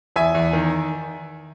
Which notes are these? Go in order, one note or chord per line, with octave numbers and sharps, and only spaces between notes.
E2 E5 G#5
E2
D#3